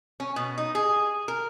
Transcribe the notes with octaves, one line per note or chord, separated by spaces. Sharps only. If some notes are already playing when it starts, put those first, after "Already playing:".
C#4
B2
D#4
G#4
A#4